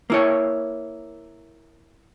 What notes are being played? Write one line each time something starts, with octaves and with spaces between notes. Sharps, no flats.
A#3 E4 C#5